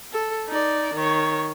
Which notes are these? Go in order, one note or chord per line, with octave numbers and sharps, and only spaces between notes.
A4
D#4 D5
D#3 C#5